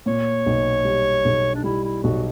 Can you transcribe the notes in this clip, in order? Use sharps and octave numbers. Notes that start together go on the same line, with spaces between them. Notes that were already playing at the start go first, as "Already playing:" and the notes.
A#2 C#5
B1
G3
B1
D4
G3 E4
E4
B1 F#4